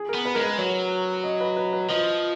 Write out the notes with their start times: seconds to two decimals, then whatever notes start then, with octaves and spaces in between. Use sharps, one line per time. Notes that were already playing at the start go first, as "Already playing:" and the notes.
Already playing: G#4
0.09 A#4
0.14 B3
0.25 B4
0.34 G#3 A#4
0.41 B4
0.58 F#3 C#5
1.23 D#5
1.40 B4
1.56 B4
1.73 B4
1.89 F3 D#5